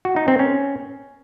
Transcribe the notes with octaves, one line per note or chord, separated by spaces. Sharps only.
F#4
D#4
C4
C#4